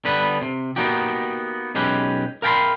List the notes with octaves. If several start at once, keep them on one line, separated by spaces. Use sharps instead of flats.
D3 G3 B3 B4
C3
A#3 B3 D4 D#4 F#4 G4
B1 G#3 C#4 G4 B4
A#4 F5 G5 A5 B5 C6